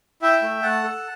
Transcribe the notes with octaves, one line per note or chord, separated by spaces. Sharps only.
E4 E5 G5
A3
A3 F#5 A5
A4